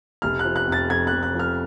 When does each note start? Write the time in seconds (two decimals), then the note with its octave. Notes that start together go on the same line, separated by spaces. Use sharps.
0.22 F1 F6
0.39 F#6
0.44 F3
0.56 F#6
0.67 F2 A6
0.89 F2 G#6
1.07 F1 F#6
1.23 F#6
1.34 F3 F6